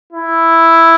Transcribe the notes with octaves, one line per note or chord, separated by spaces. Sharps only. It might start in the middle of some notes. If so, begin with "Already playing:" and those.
E4